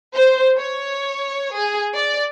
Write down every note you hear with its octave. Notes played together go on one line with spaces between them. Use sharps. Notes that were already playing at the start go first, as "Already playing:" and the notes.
C5
C#5
G#4
D5